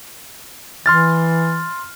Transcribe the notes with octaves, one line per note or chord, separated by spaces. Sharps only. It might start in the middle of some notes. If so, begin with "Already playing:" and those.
E3 C6 F6 A6